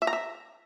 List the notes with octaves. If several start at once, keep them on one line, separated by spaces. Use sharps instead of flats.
E5
A#5
E5